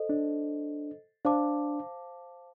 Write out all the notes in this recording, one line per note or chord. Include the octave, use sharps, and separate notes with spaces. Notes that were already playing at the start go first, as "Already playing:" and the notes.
Already playing: A4 C5 D#5
D4
D4 C5 F5 A5 D6